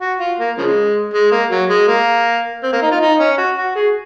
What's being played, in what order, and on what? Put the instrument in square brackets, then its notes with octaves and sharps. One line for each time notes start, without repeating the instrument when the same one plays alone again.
[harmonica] F#4
F4
A#3
C#3 F3 G#3
G#3
A#3
F#3
G#3
A#3
C4
A#3
D#4
F4
D#4
C#4
F#4
F#4
G#4